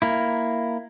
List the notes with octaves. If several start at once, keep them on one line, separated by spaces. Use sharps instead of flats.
A#3 E4